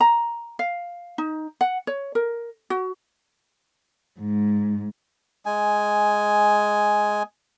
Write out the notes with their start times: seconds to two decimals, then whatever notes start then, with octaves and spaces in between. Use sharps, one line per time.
0.01 A#5
0.59 F5
1.18 D#4
1.61 F#5
1.87 C#5
2.15 A#4
2.70 F#4
4.18 G#2
5.46 G#3 G#5